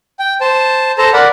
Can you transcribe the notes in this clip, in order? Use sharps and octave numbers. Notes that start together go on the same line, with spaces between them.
G5
C5 A5
A4 C5 A5 A#5
A#4 D5 F#5 B5